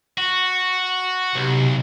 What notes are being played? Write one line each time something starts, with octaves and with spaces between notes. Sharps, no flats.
F#4
B1 C3